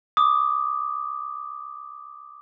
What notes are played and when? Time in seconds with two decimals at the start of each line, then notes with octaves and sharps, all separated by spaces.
0.17 D6 D#6